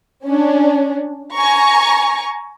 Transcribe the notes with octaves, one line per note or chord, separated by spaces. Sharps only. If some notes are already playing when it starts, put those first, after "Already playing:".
C#4 D4
G#5 A#5 C#6